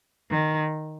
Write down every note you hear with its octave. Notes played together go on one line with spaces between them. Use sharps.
D#3